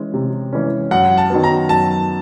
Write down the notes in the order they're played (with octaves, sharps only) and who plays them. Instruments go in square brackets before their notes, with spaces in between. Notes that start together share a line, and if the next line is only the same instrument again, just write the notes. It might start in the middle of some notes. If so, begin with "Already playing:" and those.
Already playing: [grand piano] E3 G#3 C#4
C3
E3 G#3 C#4
[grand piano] F#2 [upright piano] F#5
[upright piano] A5
[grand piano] D#3 F#3 B3
[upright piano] A#5
[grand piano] F#2 [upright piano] A5